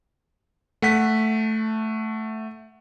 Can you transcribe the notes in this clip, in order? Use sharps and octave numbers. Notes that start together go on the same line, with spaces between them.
A3 F#5 B6